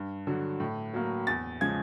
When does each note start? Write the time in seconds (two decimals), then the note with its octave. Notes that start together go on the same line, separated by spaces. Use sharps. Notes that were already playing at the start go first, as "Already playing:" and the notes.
Already playing: G2
0.27 D3 F#3
0.60 A2
0.93 F#3 A#3
1.27 E2 A6
1.61 C#3 F3 G#3 G#6